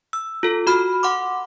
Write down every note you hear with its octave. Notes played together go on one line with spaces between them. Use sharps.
E6
F4 A4
F#4 B5 F6
F#5 C6 D6